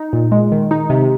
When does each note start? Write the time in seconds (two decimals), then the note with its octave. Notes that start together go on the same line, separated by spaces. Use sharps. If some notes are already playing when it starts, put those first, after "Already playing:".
Already playing: D#4
0.13 A#2
0.32 G#3
0.52 D#3
0.71 D#4
0.90 C3